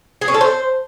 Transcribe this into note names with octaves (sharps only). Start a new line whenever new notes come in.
G#4
C#4
A4
C5